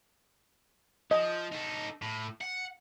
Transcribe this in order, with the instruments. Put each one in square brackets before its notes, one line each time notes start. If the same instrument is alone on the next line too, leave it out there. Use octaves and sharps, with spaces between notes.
[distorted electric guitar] F3 [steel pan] D#5
[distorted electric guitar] D#4 A4
A2
F#5